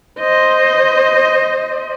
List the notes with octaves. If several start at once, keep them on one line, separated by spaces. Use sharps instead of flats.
C5 D#5